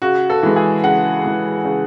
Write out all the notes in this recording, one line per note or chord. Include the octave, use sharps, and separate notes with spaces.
C#3 F#4
A4
E3 G#3
G#4
C#3 F#5
E3 G#3
C#3